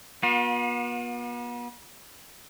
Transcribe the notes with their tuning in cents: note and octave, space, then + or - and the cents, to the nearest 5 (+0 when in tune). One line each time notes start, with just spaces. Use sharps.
B3 -40 F4 +45